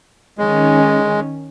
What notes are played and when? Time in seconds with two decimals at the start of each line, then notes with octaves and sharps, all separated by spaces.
0.38 D#3 G#3 C#4